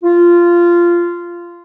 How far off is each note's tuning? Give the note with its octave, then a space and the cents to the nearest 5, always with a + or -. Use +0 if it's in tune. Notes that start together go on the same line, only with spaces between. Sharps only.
F4 -15